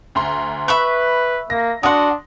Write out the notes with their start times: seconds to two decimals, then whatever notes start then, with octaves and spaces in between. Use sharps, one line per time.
0.15 D2 A#5 C6
0.68 B4 E5 B5 C#6 F#6
1.50 A#3 A#6
1.83 D4 F#4 F#5 C6 D#6